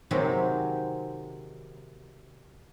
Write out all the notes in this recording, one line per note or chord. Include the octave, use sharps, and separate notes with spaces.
C3 D#3 F#3 G#3 C4 G4